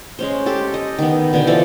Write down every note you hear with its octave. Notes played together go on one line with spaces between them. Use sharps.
G#3 C#4 C5
G4 A4
D#5
D#3 B3
B2 D3 G5 G#5
E3 F3 A4 D5